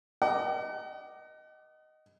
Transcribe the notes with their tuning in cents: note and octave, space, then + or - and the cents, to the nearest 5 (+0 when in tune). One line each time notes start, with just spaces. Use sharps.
D#5 +0 F#5 +40 D6 +10